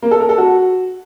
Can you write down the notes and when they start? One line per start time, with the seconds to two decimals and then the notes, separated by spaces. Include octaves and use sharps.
0.02 A#3
0.11 A4
0.20 A#4
0.29 A4
0.38 F#4